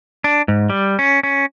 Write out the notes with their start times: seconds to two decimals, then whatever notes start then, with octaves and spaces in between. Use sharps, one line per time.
0.24 D4
0.48 G#2
0.70 G3
0.99 C#4
1.23 C#4